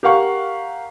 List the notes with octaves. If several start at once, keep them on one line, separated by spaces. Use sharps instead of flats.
G4 A#4 F5 F#5 C#6